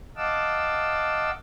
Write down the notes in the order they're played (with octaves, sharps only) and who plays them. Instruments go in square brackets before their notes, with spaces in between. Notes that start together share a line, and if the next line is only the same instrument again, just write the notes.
[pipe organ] D#5 F5 F#5 A5 D6 E6